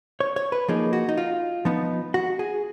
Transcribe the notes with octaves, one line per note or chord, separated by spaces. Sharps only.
C#5
C#5
B4
F3 A#3 D#4 G#4
F#4
D#4
F4
F3 B3 D#4
F#4
G#4